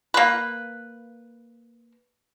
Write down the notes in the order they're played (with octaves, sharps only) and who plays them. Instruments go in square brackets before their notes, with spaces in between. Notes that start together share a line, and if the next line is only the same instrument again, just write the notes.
[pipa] A#3 B4